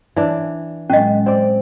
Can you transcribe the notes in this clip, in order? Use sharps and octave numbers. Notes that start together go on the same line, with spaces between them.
E3 D4
A2 F#3 G#3 C#4 D#5
C4 D5